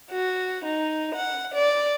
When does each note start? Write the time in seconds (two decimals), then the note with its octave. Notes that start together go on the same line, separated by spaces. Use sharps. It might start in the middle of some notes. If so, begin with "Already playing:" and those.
0.11 F#4
0.65 D#4
1.15 F#5
1.54 D5